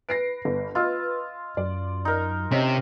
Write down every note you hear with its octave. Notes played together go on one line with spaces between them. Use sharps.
B4 A#6 C7 D7
G1
F4 D#5 E6
F#2 D5
D#4 A#4
C3 C#4 C#5 D#5 A#5